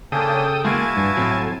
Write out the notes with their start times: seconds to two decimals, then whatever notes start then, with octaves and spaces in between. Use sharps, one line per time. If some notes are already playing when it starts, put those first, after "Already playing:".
0.12 C#3 A#3 C#4 D4 A4 G5 D#6
0.65 G#3 A#3 E4 F#4 F5 G#5 A5
0.97 G2
1.17 A2 F#3 C4